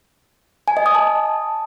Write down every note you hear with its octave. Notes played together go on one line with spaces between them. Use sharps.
G#5
D#5
D#6
A5